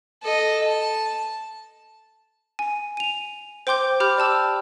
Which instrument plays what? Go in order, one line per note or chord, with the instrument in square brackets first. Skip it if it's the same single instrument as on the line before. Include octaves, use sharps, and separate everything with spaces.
[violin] A4 D#5
A5
[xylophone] G#5
D#7 F7
C5 G5 C6 D6 G6
G4 B5 D6 F6 G6
D5 G5 A5 E6